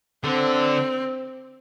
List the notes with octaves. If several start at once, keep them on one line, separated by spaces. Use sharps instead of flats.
D3 C4